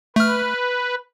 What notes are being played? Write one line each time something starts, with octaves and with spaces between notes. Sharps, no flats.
A3 B4 F6